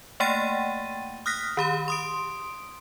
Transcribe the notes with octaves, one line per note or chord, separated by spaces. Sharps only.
A3 A#3 F#5 G5 A6 D#7
D#6 F6 F#6 A#6 B6
D#3 G4 B5
C6 D#6 D7